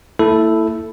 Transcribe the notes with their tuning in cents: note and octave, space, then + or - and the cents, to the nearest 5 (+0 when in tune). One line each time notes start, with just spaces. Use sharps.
A#3 -40 E4 +0 A4 +0